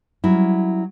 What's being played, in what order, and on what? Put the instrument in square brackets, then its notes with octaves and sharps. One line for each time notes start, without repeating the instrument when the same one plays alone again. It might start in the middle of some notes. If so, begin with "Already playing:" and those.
[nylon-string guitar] F#3 G3 C#4 E4